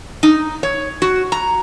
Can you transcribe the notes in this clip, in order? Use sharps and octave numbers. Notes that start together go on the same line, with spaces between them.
D#4
C#5
F#4
A#5